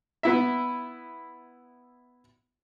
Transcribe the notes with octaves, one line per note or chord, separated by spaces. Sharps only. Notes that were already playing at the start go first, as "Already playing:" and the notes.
B3 E4 E5